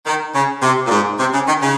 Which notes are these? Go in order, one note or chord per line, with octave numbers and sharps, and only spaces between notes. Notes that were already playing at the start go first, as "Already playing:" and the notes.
D#3
C#3
C3
A#2
G#2
C3
C#3
D#3
C#3